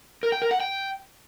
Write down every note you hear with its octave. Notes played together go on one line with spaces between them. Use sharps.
A#4
G5
A#4
F#5
G5